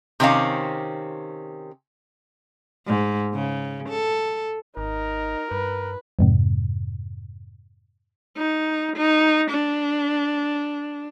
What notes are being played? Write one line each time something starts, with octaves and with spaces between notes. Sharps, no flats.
C3 D#3 C4 C#4 F5
G#2
C#3
A4
G#1 D#4 A#4
G2 B4
F2 G#2 C3
D#4
D#4
D4